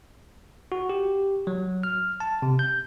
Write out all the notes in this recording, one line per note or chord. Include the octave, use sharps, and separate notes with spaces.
F#4
G4
F#3
F6
A5
C3
G6